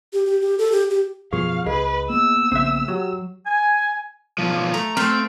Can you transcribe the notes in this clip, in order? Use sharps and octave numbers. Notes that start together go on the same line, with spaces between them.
G4
G4
G4
A4
G4
G4
F#2 B2 F3 G#4 F5 C#6
C#2 G#4 B4 D#5
A#3 B3 E6
A#1 C#3 C4 E5 F#6
F#3 F#4 G4
G#5
B1 F3
A3 A#5
A3 C4 F5